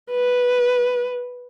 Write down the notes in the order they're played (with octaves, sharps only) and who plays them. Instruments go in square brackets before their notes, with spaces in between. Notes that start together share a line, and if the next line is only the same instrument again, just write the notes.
[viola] B4